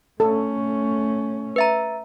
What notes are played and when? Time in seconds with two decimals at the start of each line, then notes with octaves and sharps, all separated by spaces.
0.20 A3 C#4 A4
1.56 B4 E5 A#5